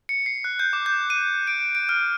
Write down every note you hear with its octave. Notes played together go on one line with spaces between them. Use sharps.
C#7
C7
F#6
G6
D6
G6
D#7
D7
D7
F6